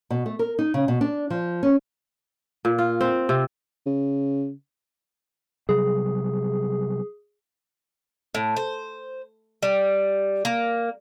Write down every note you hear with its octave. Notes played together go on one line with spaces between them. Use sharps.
B2
A3
A#4
D#4
C#3
B2
D4
F3
C#4
A#2
F4
C4
C3
C#3
C3 F#3 G3 G#4
A2
C5
G3
A#3